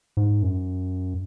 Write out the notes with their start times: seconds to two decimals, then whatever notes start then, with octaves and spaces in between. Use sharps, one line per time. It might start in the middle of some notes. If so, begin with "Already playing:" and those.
0.17 G#2
0.42 F#2